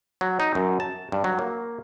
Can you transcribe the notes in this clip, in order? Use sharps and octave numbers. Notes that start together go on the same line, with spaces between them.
F#3
D#4
F#2
A5
G2
F#3
A#3